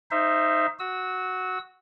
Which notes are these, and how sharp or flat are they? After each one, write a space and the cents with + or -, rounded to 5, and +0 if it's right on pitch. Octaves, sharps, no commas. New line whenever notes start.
D#4 +0 C5 +0 E5 +25
F#4 +0 E6 -30